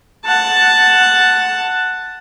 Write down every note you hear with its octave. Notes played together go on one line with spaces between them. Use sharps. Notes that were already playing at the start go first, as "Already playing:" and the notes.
F#5 A5